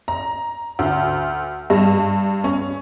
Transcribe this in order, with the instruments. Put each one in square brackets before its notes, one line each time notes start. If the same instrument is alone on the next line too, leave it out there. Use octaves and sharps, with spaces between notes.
[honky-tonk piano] A#5
D2
G2
C#4